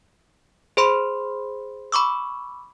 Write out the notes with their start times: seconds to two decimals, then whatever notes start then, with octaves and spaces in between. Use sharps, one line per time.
0.77 G#4 C5 B5 C6
1.92 B5 C#6 D6 E6